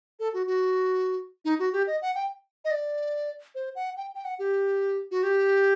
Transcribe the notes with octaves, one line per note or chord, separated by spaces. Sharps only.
A4
F#4
F#4
D#4
F#4
G4
D#5
F#5
G5
D#5
D5
C5
F#5
G5
G5
F#5
G4
F#4
G4